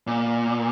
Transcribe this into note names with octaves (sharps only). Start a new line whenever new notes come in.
A#2